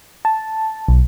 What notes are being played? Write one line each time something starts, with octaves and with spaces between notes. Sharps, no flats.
A5
B1